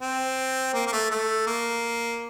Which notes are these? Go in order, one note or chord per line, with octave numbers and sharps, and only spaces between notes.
C4
A#3
A#3
A3
A3
A#3